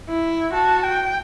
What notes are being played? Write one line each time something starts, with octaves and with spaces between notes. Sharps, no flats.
E4
F#4 A5
G5